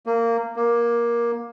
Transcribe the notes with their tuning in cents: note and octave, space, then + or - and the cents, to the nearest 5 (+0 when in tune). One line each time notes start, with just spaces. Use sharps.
A#3 -15
A#3 +15